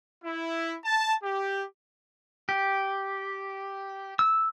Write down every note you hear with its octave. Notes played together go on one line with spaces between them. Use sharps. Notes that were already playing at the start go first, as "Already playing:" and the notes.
E4
A5
G4
G4
E6